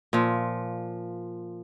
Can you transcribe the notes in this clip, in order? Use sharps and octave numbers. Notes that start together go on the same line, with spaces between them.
A#2 F3